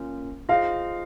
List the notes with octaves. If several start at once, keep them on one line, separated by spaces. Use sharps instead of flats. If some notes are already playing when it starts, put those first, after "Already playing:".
Already playing: A#3 C#4 F4 A#4
F4 G#4 C5 D#5 F5